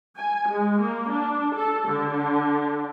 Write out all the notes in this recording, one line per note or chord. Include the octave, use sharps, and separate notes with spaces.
G#5
G#3
A#3
D4
A4
D3